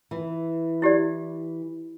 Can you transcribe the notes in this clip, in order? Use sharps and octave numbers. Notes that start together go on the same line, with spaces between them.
E3
E4 G4 D5